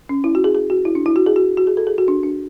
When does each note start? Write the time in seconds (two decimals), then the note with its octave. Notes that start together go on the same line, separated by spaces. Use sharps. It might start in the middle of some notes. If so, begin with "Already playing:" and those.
0.09 C#4
0.24 E4
0.35 F#4
0.44 G#4
0.55 G#4
0.70 F#4
0.85 E4
0.95 D4
1.06 E4
1.16 F#4
1.26 G#4
1.36 F#4
1.57 F#4
1.67 G#4
1.77 A4
1.87 G#4
1.98 F#4
2.08 D4
2.23 D4